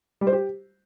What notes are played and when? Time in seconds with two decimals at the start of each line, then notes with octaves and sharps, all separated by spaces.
0.21 G3
0.27 C5
0.33 G4